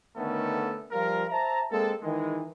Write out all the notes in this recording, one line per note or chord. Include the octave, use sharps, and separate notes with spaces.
D3 D#3 A3 B3 C#4 A4
F3 G3 F4 A#4
C5 E5 A5 A#5
G#3 A#3 C4 A4
D#3 E3 G#3